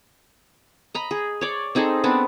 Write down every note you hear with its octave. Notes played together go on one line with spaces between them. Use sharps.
D#5 A#5 B5
G#4
C#5 D5
C4 D#4 G#4 A4
B3 C4 D4